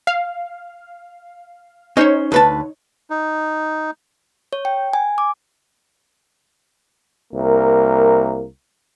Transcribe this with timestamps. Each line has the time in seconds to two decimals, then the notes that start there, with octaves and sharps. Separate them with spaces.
0.07 F5
1.97 C#4 D#4 C5 C#5
2.32 D2 B4 A5
3.10 D#4
4.53 C#5
4.65 G5
4.93 G#5
5.18 D6
7.34 C2 A#3 A#4